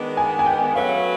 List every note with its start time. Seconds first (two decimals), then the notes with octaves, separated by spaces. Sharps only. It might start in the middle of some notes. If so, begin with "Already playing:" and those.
Already playing: D#3 G#3 B3 D4
0.17 G#5
0.39 G#5
0.46 G5
0.74 F#3 A3 C#4 F#4 B4 F5